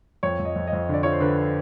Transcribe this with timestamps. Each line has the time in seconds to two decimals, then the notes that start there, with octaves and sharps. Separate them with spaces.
0.23 F2 C#5
0.40 F2
0.45 D#5
0.56 F2
0.67 D#5
0.73 F2
0.89 D3 D5
1.03 F3 C#5
1.12 C5
1.20 D3 B4